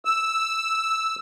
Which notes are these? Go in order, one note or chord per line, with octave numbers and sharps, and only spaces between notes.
E6